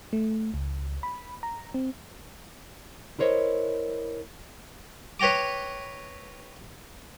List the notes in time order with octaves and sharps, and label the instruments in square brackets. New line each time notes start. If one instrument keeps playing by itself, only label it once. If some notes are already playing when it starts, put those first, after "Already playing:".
[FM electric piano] A3
C#2
B5
A#5
C4
[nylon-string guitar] E4 A#4 C5 C#5 D#5
[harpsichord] B4 C#5 G5 A#5 D6